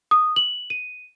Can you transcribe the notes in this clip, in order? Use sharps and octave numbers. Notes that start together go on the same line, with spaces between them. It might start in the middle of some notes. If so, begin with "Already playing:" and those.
D#6
F#7
D#7